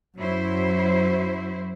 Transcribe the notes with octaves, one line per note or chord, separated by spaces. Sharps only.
F#2 F#3 E4 C5